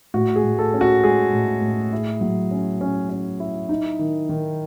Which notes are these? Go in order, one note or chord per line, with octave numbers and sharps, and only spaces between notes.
A2 F#4
G#4
A2
A4
C#4
F#4
G#3 G#4
A2
A2
E4
F#3
C#4
C#4
C#4
E4
D#4
D#3
D#3